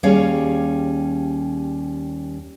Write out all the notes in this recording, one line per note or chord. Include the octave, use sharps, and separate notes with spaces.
D#2 G3 C#4 G#4 C#5 F5